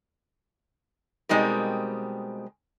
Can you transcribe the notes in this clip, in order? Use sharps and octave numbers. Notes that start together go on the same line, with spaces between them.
B2 G3 G#3 C4 D#4 A#4